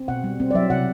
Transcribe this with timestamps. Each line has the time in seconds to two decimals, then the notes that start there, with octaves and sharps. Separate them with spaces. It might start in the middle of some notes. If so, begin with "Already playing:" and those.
Already playing: C4
0.08 B2 F#5
0.24 G3
0.40 C4
0.51 D5
0.54 F#3 E5
0.70 C3 F#5